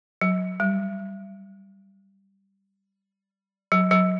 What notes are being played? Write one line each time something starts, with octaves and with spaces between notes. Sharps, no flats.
F#3
G3
F#3
F#3